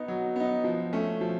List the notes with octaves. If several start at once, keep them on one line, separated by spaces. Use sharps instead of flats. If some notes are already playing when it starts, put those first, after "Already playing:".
Already playing: B3 D#4
F#3
B3 D#4
F3
A3 C#4
F3